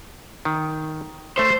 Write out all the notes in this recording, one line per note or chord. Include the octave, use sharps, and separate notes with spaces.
D#3
A3 C5 E5